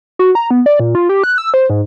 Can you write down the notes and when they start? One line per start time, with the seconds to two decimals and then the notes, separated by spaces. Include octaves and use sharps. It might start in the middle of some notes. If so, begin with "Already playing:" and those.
0.19 F#4
0.35 A#5
0.51 B3
0.66 D5
0.80 A#2
0.95 F4
1.09 G4
1.24 F#6
1.38 E6
1.54 C5
1.70 G#2